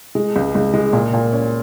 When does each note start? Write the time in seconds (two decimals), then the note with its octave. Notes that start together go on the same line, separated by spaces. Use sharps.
0.15 G#3
0.36 C#2
0.55 C#2
0.74 G#3
0.93 A#2
1.14 A#2
1.33 C#4